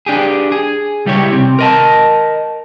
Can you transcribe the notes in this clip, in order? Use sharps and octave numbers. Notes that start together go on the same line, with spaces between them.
D4 G4 G#4
G#4
C#2 G3 E4 G4 C#5
C3 C4
A#4 D#5 A5